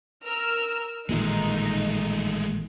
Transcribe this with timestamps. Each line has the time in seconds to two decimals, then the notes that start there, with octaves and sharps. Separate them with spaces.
0.23 A#4 E6 F6
1.09 A1 A#2 D#3 G#3 A3 D#4